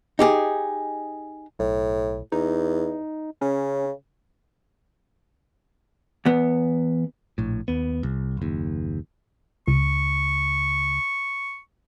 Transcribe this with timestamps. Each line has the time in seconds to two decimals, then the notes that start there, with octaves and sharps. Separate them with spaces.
0.19 D#4 G4 G#4
1.59 B1 A2
2.32 E2 D#4
3.41 C#3 C#4
6.25 E2 B3
7.38 A#1 A2
7.68 D#2 B3
8.03 C2
8.37 F#1 D#2
9.68 C#2 C#6